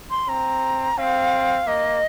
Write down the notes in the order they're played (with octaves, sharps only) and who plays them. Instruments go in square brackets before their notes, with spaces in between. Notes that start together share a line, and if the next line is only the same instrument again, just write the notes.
[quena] C6
[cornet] C4 [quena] A#5
[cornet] C4 [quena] F5
[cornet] A#3 [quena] D#5